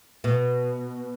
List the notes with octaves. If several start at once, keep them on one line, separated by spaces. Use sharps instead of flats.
B2